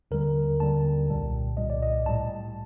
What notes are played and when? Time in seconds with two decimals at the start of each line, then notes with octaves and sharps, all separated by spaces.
0.11 D#2 D3 G3 A#4
0.60 D#2 D3 G3 A5
1.09 C2 A#2 G3
1.57 C2 A#2 G3 D#5
1.70 D5
1.82 D#5
2.06 A2 G3 A5